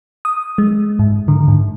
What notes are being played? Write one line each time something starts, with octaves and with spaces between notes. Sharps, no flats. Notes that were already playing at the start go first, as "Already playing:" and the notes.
D#6
G#3
G#2
D3
G#2